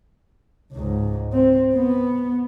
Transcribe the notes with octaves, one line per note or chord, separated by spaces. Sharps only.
C#2 G#2
C4
B3